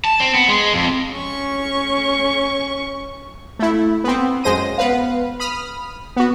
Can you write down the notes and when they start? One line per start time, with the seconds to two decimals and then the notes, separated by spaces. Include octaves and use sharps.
0.05 A5
0.20 C4
0.34 B3
0.48 G#3
0.73 F2
1.14 C#4 C#6
3.59 A3 E4
4.04 B3 C4
4.44 F#2 G#3 C5 A#6 D#7
4.78 B3 B4 F5
5.40 B5 D#6 F6
6.17 B3 F#4